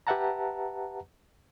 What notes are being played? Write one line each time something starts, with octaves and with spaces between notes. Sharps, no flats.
G4 B4 E5 F#5 A5 A#5